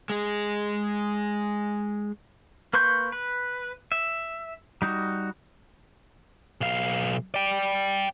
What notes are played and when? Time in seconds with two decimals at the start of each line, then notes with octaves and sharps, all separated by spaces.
0.10 G#3 G#4
2.73 A#3 B4 C6 C#6 G6
3.12 B4
3.92 E5
4.82 G3 D#4 F#4
6.61 B1 F5
7.34 D5 G5